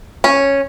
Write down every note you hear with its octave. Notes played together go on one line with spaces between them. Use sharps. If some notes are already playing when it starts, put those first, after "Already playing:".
C#4